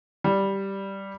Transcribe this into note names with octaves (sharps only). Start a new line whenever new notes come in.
G3